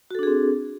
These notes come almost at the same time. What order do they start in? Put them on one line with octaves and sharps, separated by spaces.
F#4 A4 D4 G#4 C4